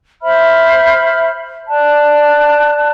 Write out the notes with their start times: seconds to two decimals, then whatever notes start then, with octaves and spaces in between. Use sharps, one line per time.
0.22 C5 E5 B5 F6
1.69 D5 A5 F#6